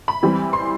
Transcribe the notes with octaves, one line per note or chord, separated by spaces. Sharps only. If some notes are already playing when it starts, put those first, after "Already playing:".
B5
E3 G3 C4
C6